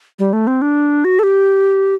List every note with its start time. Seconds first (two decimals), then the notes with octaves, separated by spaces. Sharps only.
0.19 G3
0.33 A3
0.47 C4
0.62 D4
1.05 F#4
1.19 A4
1.23 G4